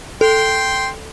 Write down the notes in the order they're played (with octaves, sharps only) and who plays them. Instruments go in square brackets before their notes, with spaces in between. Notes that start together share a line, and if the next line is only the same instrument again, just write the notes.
[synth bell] A4 [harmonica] G5 C6